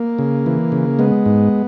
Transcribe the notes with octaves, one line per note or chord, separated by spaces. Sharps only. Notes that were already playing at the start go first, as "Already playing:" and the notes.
Already playing: A#3
C#3
E3
C#3
G#3 B3
G#2